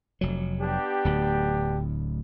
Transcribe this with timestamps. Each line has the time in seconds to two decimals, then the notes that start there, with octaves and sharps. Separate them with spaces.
0.21 F1 F#3
0.60 B3 D4 G4
1.05 D1 D2